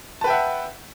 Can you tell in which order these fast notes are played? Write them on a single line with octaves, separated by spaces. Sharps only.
A5 B4 G5 E5 F#5